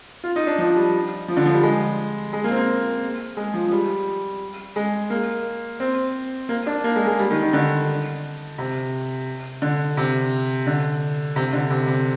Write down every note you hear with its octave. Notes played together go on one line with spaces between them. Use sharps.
F4
D#4
D4
F3
G3
F3
D3
F3
G3
G#3
G#3
A#3
C4
A#3
G#3
F3
F3
G3
G#3
A#3
C4
A#3
D4
A#3
G#3
G#3
G3
D#3
D#3
D3
C3
D3
C3
D3
C3
D3
C3
C3